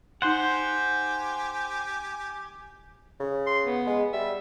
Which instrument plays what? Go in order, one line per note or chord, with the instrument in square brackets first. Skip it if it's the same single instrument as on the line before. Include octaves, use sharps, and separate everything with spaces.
[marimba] D#4 C6 [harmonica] G4 G#5 [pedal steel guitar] C5 F#5
[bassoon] C#3
[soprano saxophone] C6
B3
[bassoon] G#3
[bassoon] G3 [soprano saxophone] E5